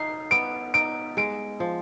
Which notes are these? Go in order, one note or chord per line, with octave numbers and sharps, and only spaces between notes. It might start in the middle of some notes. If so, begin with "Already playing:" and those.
Already playing: D#4 C7
B3 D7
D#4 D7
G#3 D7
F3